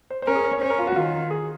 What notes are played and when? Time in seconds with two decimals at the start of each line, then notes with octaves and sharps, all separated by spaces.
0.10 C5
0.22 C5
0.27 C#4 A#4
0.35 G#4
0.44 A#4
0.53 C#5
0.61 C#4 C5
0.70 A#4
0.79 F4
0.87 F#4
0.96 D#3 F4
1.30 G#4